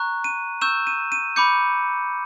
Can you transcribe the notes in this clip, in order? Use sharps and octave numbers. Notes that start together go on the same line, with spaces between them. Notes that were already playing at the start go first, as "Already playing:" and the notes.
Already playing: A#5 C#6 F#6
D#7
C#6 E6 G6 E7
D#7
D#7
B5 D6 G6 C#7